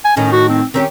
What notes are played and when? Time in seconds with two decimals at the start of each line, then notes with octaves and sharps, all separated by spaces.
0.05 G#5
0.17 A2 D#3 C#4 D#4
0.33 F#4
0.49 C4
0.74 D#3 C4 C#4 G4